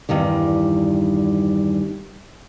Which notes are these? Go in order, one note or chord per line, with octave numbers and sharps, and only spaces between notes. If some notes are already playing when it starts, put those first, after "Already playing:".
E2 G2 D#3 G3